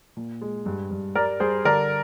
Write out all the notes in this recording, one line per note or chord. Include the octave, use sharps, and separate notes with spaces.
A#2
G#3
G2
G2
G3 A#4 D5
G3 G#4 C5
D3 A#4 D5